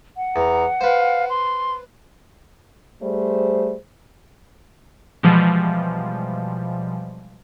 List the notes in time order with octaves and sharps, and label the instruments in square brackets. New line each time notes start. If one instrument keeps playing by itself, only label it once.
[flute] F#5
[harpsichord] E2 [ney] A#5
[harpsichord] B4 C5 [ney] F5
[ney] C6
[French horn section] G3 A3 G#4 C5
[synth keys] B2 E3 F3 G3 G#3